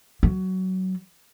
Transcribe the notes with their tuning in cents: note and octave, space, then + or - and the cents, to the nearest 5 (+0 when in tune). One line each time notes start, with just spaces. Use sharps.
F#3 +15